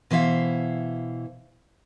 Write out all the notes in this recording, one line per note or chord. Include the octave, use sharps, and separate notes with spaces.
B2 E3 C5 E5 F5